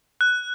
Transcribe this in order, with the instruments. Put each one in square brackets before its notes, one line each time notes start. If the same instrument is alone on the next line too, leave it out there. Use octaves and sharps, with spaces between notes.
[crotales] F#6